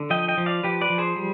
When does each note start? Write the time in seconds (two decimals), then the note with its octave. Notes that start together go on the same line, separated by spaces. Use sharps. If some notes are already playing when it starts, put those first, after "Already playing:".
Already playing: D3
0.10 F3 D#5 G5
0.28 D#5 G5
0.38 F3
0.46 D5 F5
0.63 F3 G4 B4
0.81 B4 D5
0.90 F3
0.98 G#4 C5
1.16 G3